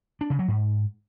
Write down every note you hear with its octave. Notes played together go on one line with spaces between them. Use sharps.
D4
C#3
F#3
G#2